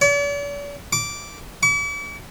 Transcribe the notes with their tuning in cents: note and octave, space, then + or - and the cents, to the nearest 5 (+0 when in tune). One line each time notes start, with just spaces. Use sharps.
D5 -45
D6 -10
D6 -45